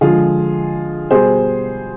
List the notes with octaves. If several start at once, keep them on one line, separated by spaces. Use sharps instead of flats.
D3 F3 G#3 F4 G#4
B2 G3 G#4 C5